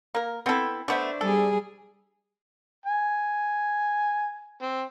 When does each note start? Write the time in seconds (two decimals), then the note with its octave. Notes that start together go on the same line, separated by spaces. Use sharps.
0.15 A#3 A#4
0.46 B3 C4 E4 A4
0.88 A3 B3 D4 C5 E5
1.21 G3 G#4 A4
2.86 G#5
4.62 C4